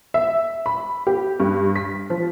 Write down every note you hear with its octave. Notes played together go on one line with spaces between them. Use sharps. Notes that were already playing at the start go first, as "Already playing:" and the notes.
E5
B5
G4
G2
B6
F3